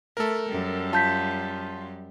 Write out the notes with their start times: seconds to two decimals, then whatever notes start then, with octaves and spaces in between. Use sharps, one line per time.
0.17 A3 A4 A#4
0.50 F#2 G3
0.93 F4 A5 G6 B6